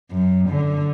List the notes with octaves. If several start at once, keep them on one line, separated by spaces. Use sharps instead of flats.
F#2
D3